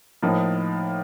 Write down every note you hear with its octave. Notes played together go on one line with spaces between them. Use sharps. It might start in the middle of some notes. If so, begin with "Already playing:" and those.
A2 F3 A#3 D#4